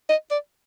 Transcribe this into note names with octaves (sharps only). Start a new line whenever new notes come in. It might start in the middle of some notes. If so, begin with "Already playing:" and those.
D#5
D5